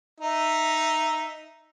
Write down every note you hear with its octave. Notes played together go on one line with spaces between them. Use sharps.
D#4 E5